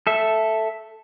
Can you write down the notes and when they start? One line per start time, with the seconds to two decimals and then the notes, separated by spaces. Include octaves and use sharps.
0.07 A4 E5